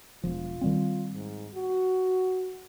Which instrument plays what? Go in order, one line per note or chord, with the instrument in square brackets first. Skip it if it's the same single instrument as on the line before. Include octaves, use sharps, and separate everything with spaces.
[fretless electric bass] E1 F3 [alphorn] F4
[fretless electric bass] D#3 G3 C4
[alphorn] G#2
F#4